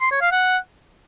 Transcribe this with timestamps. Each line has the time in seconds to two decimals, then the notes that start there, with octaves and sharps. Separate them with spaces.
0.01 C6
0.11 C#5
0.22 F5
0.32 F#5